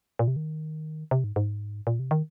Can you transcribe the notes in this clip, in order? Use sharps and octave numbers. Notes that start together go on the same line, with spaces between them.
A#2
C3
D#3
C3
G#2
G#2
A#2
C3
D#3